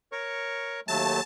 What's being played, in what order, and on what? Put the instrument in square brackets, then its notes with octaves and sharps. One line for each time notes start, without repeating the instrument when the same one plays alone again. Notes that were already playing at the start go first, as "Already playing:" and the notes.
[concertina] A#4 C#5 C#6
[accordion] D#2 F#3 A3 [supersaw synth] A5